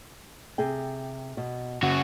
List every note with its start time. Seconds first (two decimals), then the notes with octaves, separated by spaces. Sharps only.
0.58 C3 G#4 G5
1.37 B2
1.83 C#3 F#4